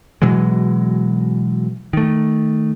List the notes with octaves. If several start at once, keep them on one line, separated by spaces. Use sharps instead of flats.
B2 E3 F#3 G#3
D#3 A3